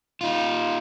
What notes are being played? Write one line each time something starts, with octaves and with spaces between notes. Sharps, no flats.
D#4 F4